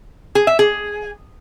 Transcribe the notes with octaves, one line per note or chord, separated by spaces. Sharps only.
G#4
E5
G#4